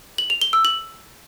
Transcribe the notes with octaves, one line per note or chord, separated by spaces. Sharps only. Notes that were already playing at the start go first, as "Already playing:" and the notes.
F#7
F7
G7
E6
F#7